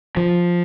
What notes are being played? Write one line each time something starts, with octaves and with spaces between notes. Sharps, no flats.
F3